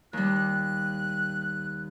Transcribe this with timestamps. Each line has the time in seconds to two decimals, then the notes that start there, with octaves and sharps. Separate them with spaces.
0.13 D#2 G3 F#6